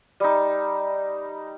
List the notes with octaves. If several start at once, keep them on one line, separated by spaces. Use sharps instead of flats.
G3 D#4